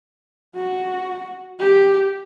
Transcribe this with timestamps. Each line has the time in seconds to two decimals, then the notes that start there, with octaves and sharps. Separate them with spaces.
0.56 F#4
1.60 G4